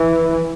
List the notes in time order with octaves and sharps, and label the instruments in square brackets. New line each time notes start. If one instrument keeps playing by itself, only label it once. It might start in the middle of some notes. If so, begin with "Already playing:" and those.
Already playing: [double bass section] E3